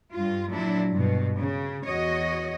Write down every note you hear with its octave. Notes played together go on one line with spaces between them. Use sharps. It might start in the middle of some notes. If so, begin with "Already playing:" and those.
G2 F4
A#2 F#3 D4 E4
G2 B2
C#3
E2 F#4 C#5 D#5